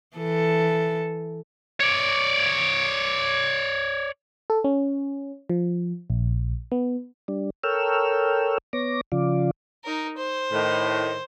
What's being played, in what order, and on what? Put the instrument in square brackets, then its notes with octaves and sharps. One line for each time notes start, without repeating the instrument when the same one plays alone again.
[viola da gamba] E3 A4
[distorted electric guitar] C#5 D5
[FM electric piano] A4
C#4
F3
A#1
B3
[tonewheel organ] G3 D4
A4 A#4 C#5 G5 E6 F6
B3 C#5 D6 A#6
C#3 F3 F4 D5
[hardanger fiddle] D#4 A#4
C5
[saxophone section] A2 D#3